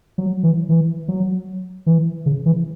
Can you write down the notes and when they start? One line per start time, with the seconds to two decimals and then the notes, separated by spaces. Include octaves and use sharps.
0.18 F#3
0.43 E3
0.69 E3
1.08 F#3
1.86 E3
2.26 C#3
2.46 E3